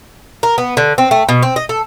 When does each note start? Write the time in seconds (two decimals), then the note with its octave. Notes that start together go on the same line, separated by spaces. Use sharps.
0.43 A#4
0.58 B3
0.77 D3
0.98 C4
1.11 A3
1.29 B2
1.43 C4
1.56 D#5
1.69 A4